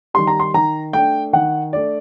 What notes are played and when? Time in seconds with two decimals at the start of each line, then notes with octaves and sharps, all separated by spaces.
0.14 D#3 G3 C6
0.27 A#5
0.40 C6
0.54 D#3 A#5
0.93 A3 G5
0.98 D4
1.33 D#3 F#5
1.73 A3 D4 D5